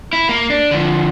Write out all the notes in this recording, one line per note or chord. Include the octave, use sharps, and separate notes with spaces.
E4
A#3
D4
D3 F3